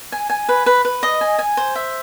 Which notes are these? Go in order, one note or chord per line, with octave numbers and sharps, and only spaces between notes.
G#5
G#5
B4
B4
B4
D#5
G#5
G#5
C5
E5